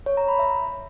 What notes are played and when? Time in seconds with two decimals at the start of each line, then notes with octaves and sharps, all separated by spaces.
0.06 C#5
0.17 A#5
0.28 B5
0.39 E5